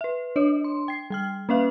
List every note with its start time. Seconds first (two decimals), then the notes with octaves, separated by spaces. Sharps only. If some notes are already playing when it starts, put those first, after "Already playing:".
0.01 B4 E5
0.36 D4 C#5 D#5
0.64 C6
0.88 G5 C7
1.10 G3 G5 F6
1.49 A#3 C#4 B4 E5 F5